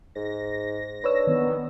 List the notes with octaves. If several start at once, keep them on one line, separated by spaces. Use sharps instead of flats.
G#2 A#6
D4 B4 C#5 E6
D#3 B3